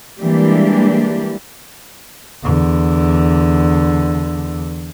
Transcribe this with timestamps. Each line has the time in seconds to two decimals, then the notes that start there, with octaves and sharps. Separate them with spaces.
0.20 E3 G3 G#3 A#3 D4 G4
2.44 E2 D3